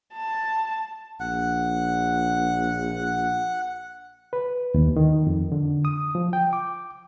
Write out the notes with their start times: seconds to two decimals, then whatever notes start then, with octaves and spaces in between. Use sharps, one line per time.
0.14 A5
1.20 A#1 F#5
4.33 B4
4.74 D#2
4.97 D#3
5.27 F2
5.52 D3
5.85 D#6
6.15 F3
6.33 G5
6.53 D6